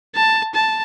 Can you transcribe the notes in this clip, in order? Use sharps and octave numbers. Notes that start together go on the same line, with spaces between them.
A5
A5